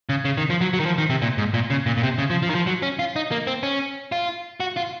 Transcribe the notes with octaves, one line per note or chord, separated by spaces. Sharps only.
C#3
C#3
D#3
F3
F#3
F#3
D#3
F3
D#3
C3
A#2
G#2
A#2
C#3
A#2
A#2
C3
C#3
F3
F3
D#3
F3
F#3
C#4
F4
D#4
A#3
C4
C#4
F4
F#4
F4